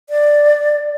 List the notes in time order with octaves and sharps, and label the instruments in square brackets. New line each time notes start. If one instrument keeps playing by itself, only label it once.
[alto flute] D5